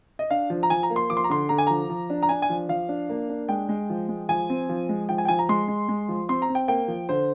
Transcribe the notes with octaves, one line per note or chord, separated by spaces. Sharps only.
D#5
D4 F5
F3
A#5
F3 G#5
A#5
A#3
C6
F3 D6
C6
A#5
D3 C6
D3 A#5
G#5
F3 A#5
F3
D4
A#5
D4 G#5
G#5
F3
F3 F5
D4
A#3
D4
G#3 G5
G#3
F3
G#3
F3 G#5
C4
F3
G#3
F3 G5
G#5
G5
F3 G#5
A#5
G#3 C6
G#3
G#3
F3
C4 C6
A#5
C4
G5
A#3 G5
F3
D3 C5